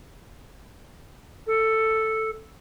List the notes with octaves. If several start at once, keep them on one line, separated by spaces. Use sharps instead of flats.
A4